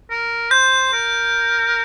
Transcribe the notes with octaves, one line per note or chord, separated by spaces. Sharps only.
A#4
C5 G6
A#4